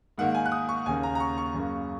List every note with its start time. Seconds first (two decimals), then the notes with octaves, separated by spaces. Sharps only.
0.18 G#2 D#3 A#3 F#5
0.35 G#5
0.46 F#6
0.52 D#6
0.69 C#6
0.86 D#2 C#3 A#3 G#5
1.03 A#5
1.15 A#5
1.20 C#6
1.38 C#6
1.54 F#2 C#3 A#3